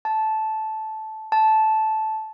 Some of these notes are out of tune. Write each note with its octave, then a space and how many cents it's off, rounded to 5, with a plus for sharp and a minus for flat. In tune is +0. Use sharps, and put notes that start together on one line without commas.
A5 -10
A5 -10